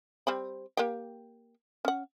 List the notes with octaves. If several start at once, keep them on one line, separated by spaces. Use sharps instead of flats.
G3 C4 B5
A#3 G4 G5
C#4 F#5